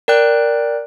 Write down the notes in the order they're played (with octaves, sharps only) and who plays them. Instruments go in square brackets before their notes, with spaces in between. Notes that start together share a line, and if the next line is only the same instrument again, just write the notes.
[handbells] A#4 D5 G5 F#6